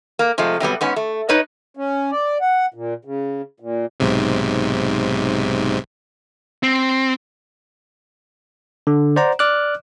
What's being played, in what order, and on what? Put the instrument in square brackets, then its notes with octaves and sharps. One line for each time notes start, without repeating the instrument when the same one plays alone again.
[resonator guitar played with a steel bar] A#3
C3 F3 G#3 A3
C3 F#3 G3 B3
G#2 B3 C#4
A3
D#4 B4 C#5 D#5
[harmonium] C#4
D5
F#5
A#2
C#3
A#2
[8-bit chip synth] B1 G#2 C3
[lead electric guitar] C4
[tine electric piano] D3
C5 D5 F#5 A#5
D5 D6 F6 F#6